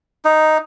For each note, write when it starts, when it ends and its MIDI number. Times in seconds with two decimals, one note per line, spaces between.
0.25 0.58 63